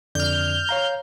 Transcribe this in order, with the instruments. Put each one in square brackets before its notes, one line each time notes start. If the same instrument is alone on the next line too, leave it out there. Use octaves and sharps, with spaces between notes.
[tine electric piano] F2 D3 D5 [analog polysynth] F6 G6
[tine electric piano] C#5 F5 A#5